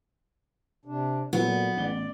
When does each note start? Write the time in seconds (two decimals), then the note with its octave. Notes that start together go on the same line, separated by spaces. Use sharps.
0.85 C3 D4
1.33 A#2 F#3 B3 E4 A4
1.77 A1 D5 G7